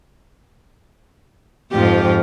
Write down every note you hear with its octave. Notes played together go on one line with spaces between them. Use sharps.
F2 G#2 F3 G4